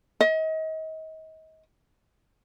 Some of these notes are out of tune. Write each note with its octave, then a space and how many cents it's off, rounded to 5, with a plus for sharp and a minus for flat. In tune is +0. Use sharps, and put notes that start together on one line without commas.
D#5 +35